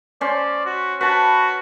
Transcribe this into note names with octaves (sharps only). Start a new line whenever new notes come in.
C#4 C5 D5
F#4
F#4 B4 A5 B5